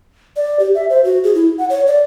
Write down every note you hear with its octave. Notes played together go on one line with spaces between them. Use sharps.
D5
G4
E5
C5
F#4
G#4
E4
F#5
C#5
D5